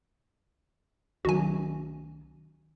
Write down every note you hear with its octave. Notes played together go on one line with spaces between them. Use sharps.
C2 D#3 F#3 F#4 G#5